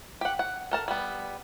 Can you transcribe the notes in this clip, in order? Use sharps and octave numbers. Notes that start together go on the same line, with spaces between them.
G4 F#5
F#5
A4 A#4 A5
G3 B3